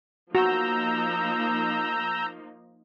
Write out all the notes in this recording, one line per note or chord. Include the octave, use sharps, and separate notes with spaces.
F3 A#3 D#4 F#4 A#5 E6 G6